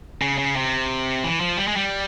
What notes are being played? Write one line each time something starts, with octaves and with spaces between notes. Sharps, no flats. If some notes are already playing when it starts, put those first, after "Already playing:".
C#3
C#3
C3
E3
F3
G3
G#3
G3